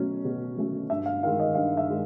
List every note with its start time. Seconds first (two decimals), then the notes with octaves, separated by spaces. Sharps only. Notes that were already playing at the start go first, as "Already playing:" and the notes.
Already playing: B2 F#3 A3 C#4
0.25 B2
0.57 F#3 A3 C#4
0.90 G2 E5
1.06 F5
1.23 D#3 G#3 F5
1.40 D#5
1.55 G2 F5
1.77 E5
1.88 D#3 G#3